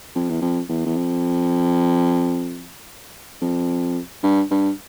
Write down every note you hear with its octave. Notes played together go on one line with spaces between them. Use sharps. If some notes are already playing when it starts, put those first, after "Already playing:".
F2
E2
F2
E2
E2
F2
F2
G2
G2